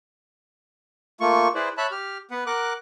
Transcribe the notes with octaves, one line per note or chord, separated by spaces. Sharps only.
A3 A#3 F4 C#6
E4 G#4 B4 C5 D5
C#5 E5 A5 B5 F#6
G4 F6
B3 B4 F#5
A#4 F#5 D6 F#6